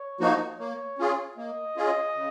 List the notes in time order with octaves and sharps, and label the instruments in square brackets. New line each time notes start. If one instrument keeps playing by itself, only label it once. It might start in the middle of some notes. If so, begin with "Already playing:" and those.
Already playing: [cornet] C#5
[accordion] F3 A#3 D#4 F#4
[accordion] A#3 [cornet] C#5
[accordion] C#4 F4 G#4
[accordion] A#3 [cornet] D#5
[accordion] C#4 F4 G#4
C#3